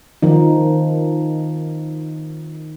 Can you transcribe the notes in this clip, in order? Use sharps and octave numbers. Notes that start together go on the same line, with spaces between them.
D#3 F3 D#4